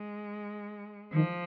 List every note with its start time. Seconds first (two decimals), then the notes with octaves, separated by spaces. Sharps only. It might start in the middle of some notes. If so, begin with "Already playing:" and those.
Already playing: G#3
1.13 D#3 F3